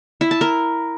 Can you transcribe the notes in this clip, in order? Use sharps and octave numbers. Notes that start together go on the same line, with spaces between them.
E4
A5
A#4